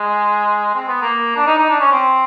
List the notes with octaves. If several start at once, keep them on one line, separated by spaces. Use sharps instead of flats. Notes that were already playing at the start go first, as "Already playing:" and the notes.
Already playing: G#3
C4
B3
A#3
D4
D#4
D#4
D4
C#4
C4